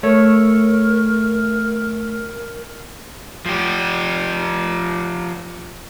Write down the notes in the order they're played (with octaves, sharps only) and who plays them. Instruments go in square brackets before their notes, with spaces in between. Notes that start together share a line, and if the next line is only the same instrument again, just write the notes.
[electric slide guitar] A3 A4 C#5 [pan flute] A#4
[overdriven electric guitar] F3 G4